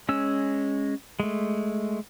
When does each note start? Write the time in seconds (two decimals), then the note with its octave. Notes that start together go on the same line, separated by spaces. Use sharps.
0.09 G#3 C#4 E6
1.20 G#3 A3